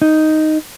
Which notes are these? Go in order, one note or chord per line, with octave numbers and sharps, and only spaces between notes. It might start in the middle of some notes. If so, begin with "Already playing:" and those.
D#4